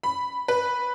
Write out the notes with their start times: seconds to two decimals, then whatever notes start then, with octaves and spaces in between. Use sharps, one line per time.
0.03 B5
0.48 B4